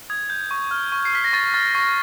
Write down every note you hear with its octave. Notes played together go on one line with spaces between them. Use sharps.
D#6 G#6
G6
C#6
F6
C#6
C7
F6 B6
A#6
C#6 A6
F6 A6
C#6 A#6